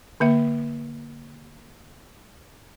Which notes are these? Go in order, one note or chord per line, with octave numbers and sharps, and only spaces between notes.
D3 A#3 E5